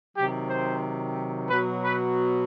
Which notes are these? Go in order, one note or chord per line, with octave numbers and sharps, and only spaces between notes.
C3 D#3 F#3 G4
C5
B2 F#3 B4
B4